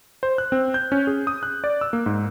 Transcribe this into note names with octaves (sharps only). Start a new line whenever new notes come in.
C5
F#6
C4
G6
C#4
G#4
D#6
F#6
D5
E6
A#3
G#2